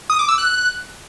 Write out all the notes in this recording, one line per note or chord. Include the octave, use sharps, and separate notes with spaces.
D#6
D6
E6
F#6